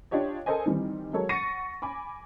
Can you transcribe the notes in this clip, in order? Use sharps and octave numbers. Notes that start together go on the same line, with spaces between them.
D4 F4 G4 C#5 D#5
A4 A#4 C5 D#5 G#5
D#3 E3 G3 C4
F#3 G#3 A4 A#4 C#5
F#5 C#6 A6 A#6 C#7 D#7
G#5 B5 D6